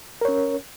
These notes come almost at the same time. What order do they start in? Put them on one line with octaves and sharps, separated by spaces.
A#4 C#5 C#4